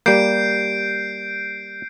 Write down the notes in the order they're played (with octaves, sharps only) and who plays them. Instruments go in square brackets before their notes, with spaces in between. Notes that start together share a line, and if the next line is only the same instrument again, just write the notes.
[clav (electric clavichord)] G3 A#3 [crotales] G6 C7 D7